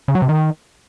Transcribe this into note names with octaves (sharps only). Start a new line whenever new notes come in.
C#3
F#3
C3
D#3